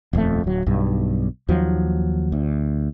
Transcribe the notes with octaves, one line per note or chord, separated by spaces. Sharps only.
D#1 F2 G#2 A3
D1 F#3
B1 G2
D#2 F3 F#3
D2